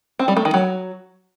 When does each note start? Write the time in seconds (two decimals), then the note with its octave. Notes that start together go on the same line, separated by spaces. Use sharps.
0.19 C4
0.28 G3
0.37 A3
0.45 D#3
0.54 F#3